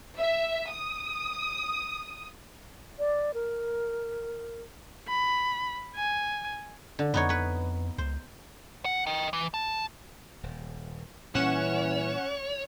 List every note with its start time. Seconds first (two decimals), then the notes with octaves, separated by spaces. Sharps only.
0.16 E5
0.70 D#6
2.99 D5
3.34 A#4
5.08 B5
5.96 G#5
6.99 D3
7.14 F2 B3 D#4 C#5
7.29 B4 C#5
7.98 C#2 C5
8.85 F#5
9.07 D#5 G5
9.33 E3
9.54 A5
10.43 D#1
11.35 A#2 E3 G3 C#4 C#5 F#5 E7